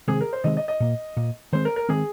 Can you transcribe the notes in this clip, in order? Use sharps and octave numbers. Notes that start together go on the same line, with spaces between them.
C3 D#3 G#3 C4 G#4
A#4
C5
C3 D#3 G#3 C4 D#5
D#5
D#5
A#2 A#3
A#2 A#3
D#3 G#3 C4 C5
A#4
A#4
D#3 G#3 C4 G#4